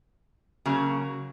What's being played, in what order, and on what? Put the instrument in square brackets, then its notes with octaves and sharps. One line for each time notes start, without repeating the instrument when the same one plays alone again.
[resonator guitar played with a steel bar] C#3 F#3 A#3